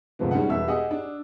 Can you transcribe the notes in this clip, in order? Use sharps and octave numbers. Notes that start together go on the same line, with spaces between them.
D2 G2 C3 F3 G#3 B3
G3 G#3 C#4 D#4 F#5
E1 B2 E5 E6
G4 G#4 D#5 F#5 G#5 D#6
D4